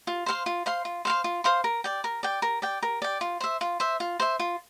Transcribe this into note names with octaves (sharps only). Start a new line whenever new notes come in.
F4
C5 F5 C6
F4
C5 F5 C6
F4
C5 F5 C6
F4
C5 F5 C6
A#4
D5 G5
A#4
D5 G5
A#4
D5 G5
A#4
D5 G5
F4
C5 E5
F4
C5 E5
F4
C5 E5
F4